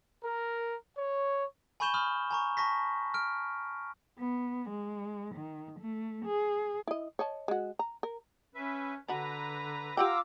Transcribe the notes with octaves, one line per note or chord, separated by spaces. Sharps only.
A#4
C#5
G#5 B5 C#6 G6 E7 G7
B5 D#6 F6
G#5 A#5 C#6
A5 C#6 A#6 B6
F6 D7
B3
G#3
D#3
A3
G#4
E4 D#5
C#5 D#5 A5
G#3 F#4
A#5
A#4
C#4 B4 E5
D3 D4 F#4 B4 A#5
F4 G4 F#5 G5 A#5 D6 E6